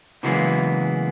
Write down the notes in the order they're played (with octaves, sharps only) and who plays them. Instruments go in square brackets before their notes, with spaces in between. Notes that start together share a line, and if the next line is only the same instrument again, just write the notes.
[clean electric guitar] C#3 E3 F#3 G#3 A#3 B3